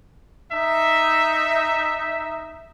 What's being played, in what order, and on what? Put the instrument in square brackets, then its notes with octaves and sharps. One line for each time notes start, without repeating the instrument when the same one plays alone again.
[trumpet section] D#4 E5